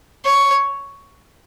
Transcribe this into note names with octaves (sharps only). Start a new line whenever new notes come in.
C#5